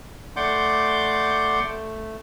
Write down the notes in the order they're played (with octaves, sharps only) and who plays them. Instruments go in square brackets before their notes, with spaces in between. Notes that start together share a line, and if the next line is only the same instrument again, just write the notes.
[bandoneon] A3 D5 F#5 C6 D6 G6
A3